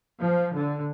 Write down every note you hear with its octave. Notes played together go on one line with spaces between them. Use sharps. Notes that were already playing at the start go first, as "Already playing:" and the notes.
F3
D3